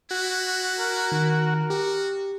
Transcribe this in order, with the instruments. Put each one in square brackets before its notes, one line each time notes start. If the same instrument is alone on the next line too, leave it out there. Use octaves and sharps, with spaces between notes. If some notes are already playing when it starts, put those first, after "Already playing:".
[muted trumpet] E4 [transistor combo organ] F#4
[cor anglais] A#4
[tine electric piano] D#3
[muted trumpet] F#4 [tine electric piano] G4